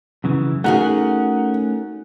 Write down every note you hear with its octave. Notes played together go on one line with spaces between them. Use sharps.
F#2 C#3 E3
A3 C#4 D#4 F#4 G#4 A#4 F#5